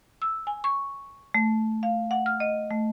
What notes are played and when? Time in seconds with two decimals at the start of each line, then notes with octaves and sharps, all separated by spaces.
0.22 E6
0.47 G#5
0.64 C#6
1.34 A3
1.83 F5
2.11 F#5
2.26 F6
2.40 D#5
2.71 A3